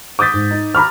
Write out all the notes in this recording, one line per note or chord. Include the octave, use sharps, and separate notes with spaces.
D6 D#6 G6 A6 B6
G#2
D#4
A#5 B5 D6 F6